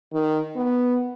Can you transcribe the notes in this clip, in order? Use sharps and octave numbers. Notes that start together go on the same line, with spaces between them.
D#3
B3